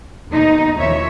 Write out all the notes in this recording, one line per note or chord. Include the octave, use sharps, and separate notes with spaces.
D#2 B2 D#4
D#2 E3 F3 C#5 E5